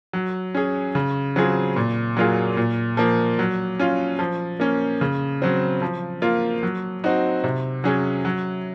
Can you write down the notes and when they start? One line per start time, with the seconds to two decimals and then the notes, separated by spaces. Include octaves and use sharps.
0.13 F#3
0.54 C#4 G#4
0.95 C#3
1.36 F#3 C4 F4 G#4
1.76 A#2
2.17 F#3 A#3 F4 G#4
2.57 A#2
2.97 F3 A#3
3.39 F#3
3.79 C#4 F4
4.19 F3
4.60 A#3 C#4
5.01 C#3
5.42 F#3 C4
5.82 F3
6.22 A#3 F4
6.63 F#3
7.04 C4 D#4 F#4
7.44 C3
7.84 F#3 C#4 G#4
8.25 F#3